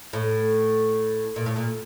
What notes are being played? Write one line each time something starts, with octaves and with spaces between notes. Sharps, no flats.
A2
A#2
A2
A#2